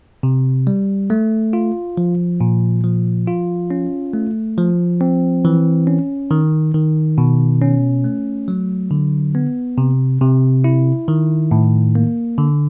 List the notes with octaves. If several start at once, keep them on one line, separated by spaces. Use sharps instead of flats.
C3
G3
A3
F4
F3
A#2
F3
F4
C#4
A3
F3
C4
E3
C#4
D#3
D#3
B2
C#4
A3
F#3
D3
B3
C3
C3
E4
D#3
A2
A#3
D3